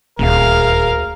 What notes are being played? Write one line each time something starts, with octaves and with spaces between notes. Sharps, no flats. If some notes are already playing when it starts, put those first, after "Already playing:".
D#1 D2 G#4 A#4 F5